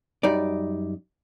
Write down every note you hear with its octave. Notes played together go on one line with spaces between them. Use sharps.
F#2 G3 D#4 D5